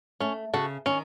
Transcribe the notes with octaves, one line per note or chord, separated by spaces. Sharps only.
A3 C#4
C#3 F#4 A4
D#3 C#4